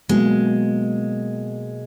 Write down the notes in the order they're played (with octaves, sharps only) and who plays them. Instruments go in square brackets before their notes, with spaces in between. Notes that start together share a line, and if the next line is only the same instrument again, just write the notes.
[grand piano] B2 F#3 A#3 [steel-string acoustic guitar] G#3